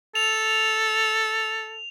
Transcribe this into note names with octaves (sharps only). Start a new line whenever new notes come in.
A4 F7